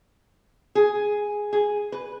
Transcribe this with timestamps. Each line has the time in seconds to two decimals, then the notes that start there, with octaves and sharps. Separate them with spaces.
0.75 G#4
1.53 G#4
1.92 B4